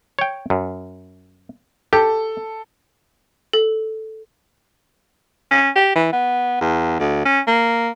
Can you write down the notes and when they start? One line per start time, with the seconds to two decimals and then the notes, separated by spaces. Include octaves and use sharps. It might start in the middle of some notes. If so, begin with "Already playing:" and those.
0.19 C#5 G5
0.50 F#2
1.93 G4 A4
3.53 A4
5.51 C#4
5.76 G4
5.96 E3
6.13 B3
6.61 E2
6.99 D2
7.25 C#4
7.47 A#3